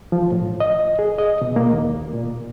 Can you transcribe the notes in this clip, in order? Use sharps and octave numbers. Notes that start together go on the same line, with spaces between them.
F3
A2
D#5
G#4
D#5
B2
A#3
D#2
A#2